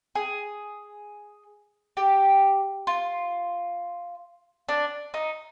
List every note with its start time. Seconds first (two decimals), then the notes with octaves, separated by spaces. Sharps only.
0.15 G#4
1.97 G4
2.87 F4
4.69 D4
5.14 D#4